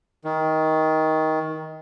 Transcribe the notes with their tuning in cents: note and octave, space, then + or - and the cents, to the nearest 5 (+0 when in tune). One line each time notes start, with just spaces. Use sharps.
D#3 +20